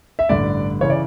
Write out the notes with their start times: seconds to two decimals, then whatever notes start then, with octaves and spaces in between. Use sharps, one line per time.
0.19 E5
0.29 A1 G2 D3 D5
0.81 C#3 E3 C#5
0.90 D5